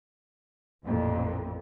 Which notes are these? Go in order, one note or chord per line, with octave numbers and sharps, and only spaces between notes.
A1 F2 A#2